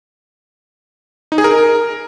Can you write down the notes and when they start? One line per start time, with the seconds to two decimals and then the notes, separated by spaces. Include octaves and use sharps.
1.32 D#4
1.38 G#4
1.44 A#4